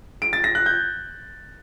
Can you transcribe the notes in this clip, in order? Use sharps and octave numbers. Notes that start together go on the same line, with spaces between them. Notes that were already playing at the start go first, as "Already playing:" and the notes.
D7
A6
A#6
F#6
G6